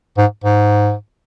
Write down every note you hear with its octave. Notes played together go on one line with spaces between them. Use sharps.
G#2
G#2